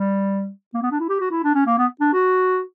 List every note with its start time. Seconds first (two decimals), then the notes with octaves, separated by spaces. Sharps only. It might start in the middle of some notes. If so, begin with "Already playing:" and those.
Already playing: G3
0.74 A#3
0.83 B3
0.92 D4
1.00 E4
1.09 G4
1.20 F#4
1.31 E4
1.44 D4
1.55 C#4
1.66 A#3
1.78 B3
2.01 D4
2.13 F#4